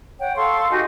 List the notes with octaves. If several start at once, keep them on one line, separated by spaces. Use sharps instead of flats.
C#5 F#5 G5
A4 F5 C6 C#6
D#4 F#4 G4 G#5